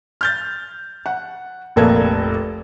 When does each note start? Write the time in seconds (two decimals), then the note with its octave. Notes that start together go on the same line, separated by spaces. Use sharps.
0.21 F6 G6 A6
1.06 F#5
1.76 F1 A#1 A#3 A4 B4 G#6